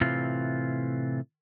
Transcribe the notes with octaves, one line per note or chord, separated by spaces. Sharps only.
A2 C3 E3 C4 F4